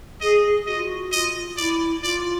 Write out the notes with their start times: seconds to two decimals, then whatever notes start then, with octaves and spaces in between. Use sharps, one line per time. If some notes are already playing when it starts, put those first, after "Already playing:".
0.21 G#4 D#5
0.66 F#4 D#5
0.76 F4
0.84 F#4
1.12 F4 D#5
1.57 E4 D5
2.02 F4 D5